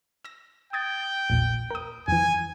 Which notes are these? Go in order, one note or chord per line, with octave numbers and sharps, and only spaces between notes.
E6 A#6
G5 D#6 G#6 A6
A#1 E2 A#2
A#4 D#6
F2 E3 G#5